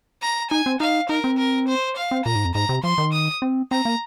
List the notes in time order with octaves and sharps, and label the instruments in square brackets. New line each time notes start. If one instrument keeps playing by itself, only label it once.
[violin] A#5
[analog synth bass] D#4 [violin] G#5
[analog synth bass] C4
[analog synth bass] D#4 [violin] F5
[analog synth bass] D#4 [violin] A#4
[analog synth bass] C4
[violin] A#4
C5
F5
[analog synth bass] C4
[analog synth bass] A#2 [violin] A#5
[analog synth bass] G#2
F2
[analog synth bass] G#2 [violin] A#5
[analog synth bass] C3
[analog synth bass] F3 [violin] C6
[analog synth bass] D#3
[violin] D#6
[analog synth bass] C4
[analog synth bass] C4 [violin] A#5
[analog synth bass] A#3